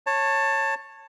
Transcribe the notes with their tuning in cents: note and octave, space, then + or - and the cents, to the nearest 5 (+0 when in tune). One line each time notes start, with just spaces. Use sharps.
C#5 -10 A5 +15